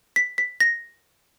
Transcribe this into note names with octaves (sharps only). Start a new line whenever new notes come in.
B6
B6
A#6